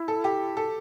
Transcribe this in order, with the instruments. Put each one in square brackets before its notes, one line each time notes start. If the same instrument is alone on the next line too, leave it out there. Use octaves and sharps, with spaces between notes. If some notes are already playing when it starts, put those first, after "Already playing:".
Already playing: [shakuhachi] E4
[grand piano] A4
G4
A4